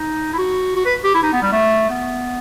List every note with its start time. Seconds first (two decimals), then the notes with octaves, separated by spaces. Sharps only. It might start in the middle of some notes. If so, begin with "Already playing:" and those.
Already playing: D#4
0.33 E4
0.38 F#4
0.76 F#4
0.85 B4
1.04 G4
1.14 E4
1.23 D#4
1.33 B3
1.43 G3
1.52 A3
1.90 B3